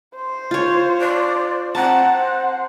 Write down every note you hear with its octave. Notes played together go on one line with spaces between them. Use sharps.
C5
F4 C#5
D5
C4 F#5 A5 A#5
C5